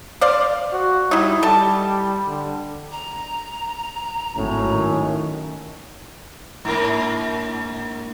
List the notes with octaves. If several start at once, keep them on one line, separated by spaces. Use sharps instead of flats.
C5 D5 F5
F#4
G3 D#4 E4
G3 A4 A5
D3
A#5
G#1 A2 F#3 C#4
D#3
G#2 A#3 D4 E4 A#4